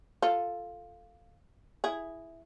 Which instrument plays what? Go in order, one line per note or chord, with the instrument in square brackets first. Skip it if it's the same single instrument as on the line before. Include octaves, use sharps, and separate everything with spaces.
[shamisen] F4 A4
E4 G#4